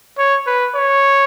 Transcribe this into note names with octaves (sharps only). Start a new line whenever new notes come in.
C#5
B4
C#5